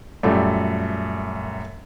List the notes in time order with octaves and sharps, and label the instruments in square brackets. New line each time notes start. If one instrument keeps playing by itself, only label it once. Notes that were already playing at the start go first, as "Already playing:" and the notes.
[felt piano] F#2 A#2 G3 A3